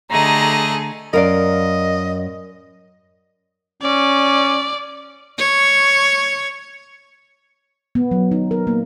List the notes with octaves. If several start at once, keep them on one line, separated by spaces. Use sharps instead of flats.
D3 A3 G4 G#4 D#5 A#5
F#2 A#4 D5 D#5 F5
C#4 D5
C#5
B3
F#3
D#4
A#4
A#3